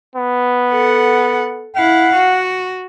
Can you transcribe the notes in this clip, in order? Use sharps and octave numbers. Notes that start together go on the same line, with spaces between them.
B3
A4 F#5
E4 F5 F#5
F#4